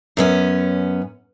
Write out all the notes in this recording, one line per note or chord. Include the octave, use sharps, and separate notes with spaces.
F#2 B3 C#4